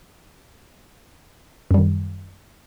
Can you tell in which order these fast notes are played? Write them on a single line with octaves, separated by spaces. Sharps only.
F#2 G3 D#3